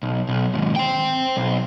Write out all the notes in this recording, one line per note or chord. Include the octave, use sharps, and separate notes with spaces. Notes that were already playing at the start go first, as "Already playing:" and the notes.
B1
B1
D#2 G#2
C5 G5
B1